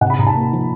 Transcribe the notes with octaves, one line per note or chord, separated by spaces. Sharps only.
C3 F#5
B5
C3 A#5
A5
A#3
F3